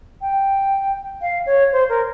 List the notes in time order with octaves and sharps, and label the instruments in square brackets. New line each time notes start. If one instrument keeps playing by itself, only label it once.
[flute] G5
F5
C#5
C5
A#4